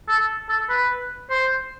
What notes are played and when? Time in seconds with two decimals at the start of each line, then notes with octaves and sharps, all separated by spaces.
0.08 A4
0.49 A4
0.69 B4
1.30 C5